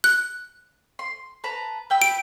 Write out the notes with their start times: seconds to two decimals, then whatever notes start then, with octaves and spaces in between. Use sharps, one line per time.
0.04 F#6
0.99 C6
1.44 B4 A5 A#5
1.90 B4 G5 E6
2.02 D7